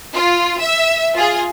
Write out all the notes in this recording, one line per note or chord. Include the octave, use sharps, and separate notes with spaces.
F4
E5
F4 G#4